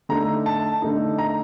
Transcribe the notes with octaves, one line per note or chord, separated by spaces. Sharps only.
D3 A3 D#4 A#5
A5
D3 A3 D#4
A#5